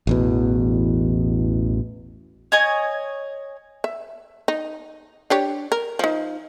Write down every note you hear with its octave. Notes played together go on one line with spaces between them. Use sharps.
A1 E2 B2
C#5 D#5 G#5
E5
D#4
D4 G4 C#5
A#4
F3 D#4